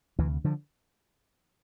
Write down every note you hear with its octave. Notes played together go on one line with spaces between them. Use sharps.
D2 C3 E3
D3 F3